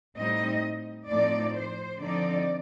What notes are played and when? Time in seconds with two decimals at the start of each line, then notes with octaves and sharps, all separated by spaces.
0.16 A2 G3 C4 D#4 D#5
1.09 A2 F3 A3 C4 D#4 D5
1.56 C5
2.02 D3 F3 C4 D#4 D5